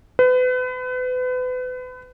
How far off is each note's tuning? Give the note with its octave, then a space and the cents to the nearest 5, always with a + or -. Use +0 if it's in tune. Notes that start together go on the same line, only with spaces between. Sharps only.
B4 +35